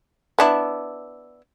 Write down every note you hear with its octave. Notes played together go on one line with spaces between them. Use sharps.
B3 D4 E4